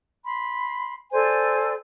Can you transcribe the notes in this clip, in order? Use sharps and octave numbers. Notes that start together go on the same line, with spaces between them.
B5 C6
A4 C5 D5 G#5